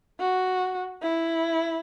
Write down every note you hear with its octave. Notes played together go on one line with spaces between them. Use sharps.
F#4
E4